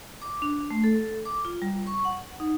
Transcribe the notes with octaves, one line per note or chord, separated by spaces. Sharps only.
D6
D4
A3
A4
D6
F4
G3
C#6
F#5
D#4